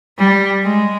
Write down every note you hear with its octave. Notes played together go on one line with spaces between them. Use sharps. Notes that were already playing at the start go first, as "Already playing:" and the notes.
G3
G#3